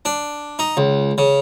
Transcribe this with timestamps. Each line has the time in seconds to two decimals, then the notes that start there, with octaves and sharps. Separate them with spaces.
0.05 D4
0.59 D#4
0.77 C#2
1.18 C#3